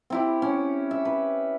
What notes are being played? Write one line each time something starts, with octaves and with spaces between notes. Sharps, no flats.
C4 E4 G4
C#4
E5
B4